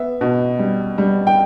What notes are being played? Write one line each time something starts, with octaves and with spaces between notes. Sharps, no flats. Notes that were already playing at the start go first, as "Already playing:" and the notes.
Already playing: B3 E5
B2
G3
G3
G5